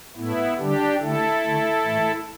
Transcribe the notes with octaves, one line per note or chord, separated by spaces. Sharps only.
A2 A3 B3 E4
D3 G3 D4 G4
D3 A3 E4 A4
D3 A3
A2 E3 A3